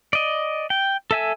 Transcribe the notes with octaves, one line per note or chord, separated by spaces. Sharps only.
D5 D#5
G5
A4 E5 G#5